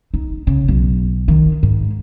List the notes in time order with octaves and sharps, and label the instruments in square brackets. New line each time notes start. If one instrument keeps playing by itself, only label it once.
[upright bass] D#4
C#3
B1
D#3
G#2